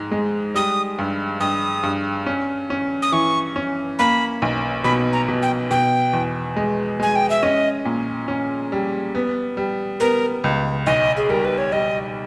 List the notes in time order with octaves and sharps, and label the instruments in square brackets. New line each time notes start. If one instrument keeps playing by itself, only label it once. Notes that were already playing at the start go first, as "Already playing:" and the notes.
Already playing: [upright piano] G#2 G#3
G#3
[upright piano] G3 [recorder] D#6
[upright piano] G2
[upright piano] G2 [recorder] D#6
[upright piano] G2
C#4
C#4
[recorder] D#6
[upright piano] E3 [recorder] C#6
[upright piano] C#4
[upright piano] A#3 [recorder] B5
[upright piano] B1
[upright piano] B2 [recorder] B5
[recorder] A#5
[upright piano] B2
[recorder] G5
[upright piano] B2 [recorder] G5
[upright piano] E2
G#3
[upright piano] G#3 [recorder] G#5
[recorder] G5
E5
[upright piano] C#4 [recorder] D#5
[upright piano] A#2
C#4
G3
B3
G3
[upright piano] B3 [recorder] A#4
[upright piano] C#2
[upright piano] B1 [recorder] D#5
[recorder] G#4
[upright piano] G3 [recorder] A#4
[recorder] B4
C#5
[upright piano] G3 [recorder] D#5